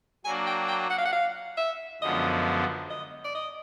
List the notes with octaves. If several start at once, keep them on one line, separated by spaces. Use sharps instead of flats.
F#3 A#3 D4 F#4 G#5
G5
G5
F#5
F5
F#5
F5
E5
F#2 D3 F3 G#3 B3 D#5
D#5
D5
D#5